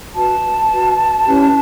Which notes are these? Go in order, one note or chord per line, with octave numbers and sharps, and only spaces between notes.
F#4 B4 A5
F#4 B4
C#4 E4 G4 B4